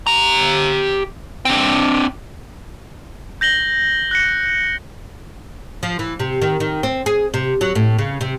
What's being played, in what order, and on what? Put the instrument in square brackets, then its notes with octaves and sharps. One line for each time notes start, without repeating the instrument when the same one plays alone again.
[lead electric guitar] G4 A#5
C4 D4
[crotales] G6 A#6 F#7 G7
F#6 A#6 C#7
[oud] F3
E3
C3
D#3
D#3
C4
G#4
C3
F#3
A2
C#3
C3